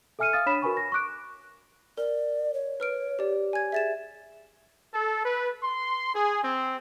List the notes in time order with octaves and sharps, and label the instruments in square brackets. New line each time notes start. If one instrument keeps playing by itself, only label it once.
[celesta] A4 E5 G#5 F6 C#7 D#7
F5 D#6 F6 A6
D4 C#5 B5 D#6 B6 E7
F#4 A#4 B4 G#5 B5 C#6
A#6
C#6 D6 F#6 D7
[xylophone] A#4 [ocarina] D5
[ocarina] C#5
[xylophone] B4 F6 D7
G4 D5
G#5 G#6
[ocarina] G#4 [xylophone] E5 A6 E7
[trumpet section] A4
B4
C6
G#4
C4